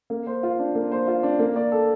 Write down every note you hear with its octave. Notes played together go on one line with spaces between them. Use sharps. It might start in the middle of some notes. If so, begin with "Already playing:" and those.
A#3
C5
F4
D4
A#3
C5
F4
D4
A#3
D5
A4